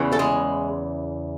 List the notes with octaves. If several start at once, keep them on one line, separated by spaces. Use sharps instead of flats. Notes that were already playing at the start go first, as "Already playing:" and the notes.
Already playing: E2 C#3 E3
A4
G#3 G#4